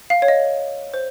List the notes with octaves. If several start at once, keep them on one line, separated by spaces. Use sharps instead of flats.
F5
C#5
D#5
C5